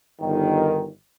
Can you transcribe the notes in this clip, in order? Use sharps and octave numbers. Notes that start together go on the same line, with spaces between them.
G1 D#3